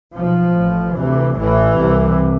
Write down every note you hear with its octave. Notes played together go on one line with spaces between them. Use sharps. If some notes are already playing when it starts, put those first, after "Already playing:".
B1 B2 F3
A1 A2
D2 C3 E3
A1 A2 E3
C2 C3